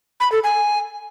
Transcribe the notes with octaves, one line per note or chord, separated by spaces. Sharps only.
B5
A4
G#5